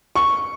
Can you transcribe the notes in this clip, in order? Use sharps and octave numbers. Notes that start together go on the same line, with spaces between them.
C#6